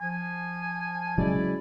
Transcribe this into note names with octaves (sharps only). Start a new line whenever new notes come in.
F3 G#5
C#3 F#3 G#3 E4 D5